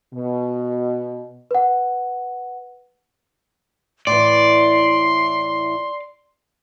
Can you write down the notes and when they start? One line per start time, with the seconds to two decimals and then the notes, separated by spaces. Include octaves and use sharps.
0.14 B2
1.51 B4 F#5
4.07 A2 E3 D5 C6